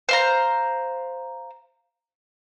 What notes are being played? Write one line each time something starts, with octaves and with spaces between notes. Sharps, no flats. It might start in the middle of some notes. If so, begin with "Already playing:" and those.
C5 F5 A#5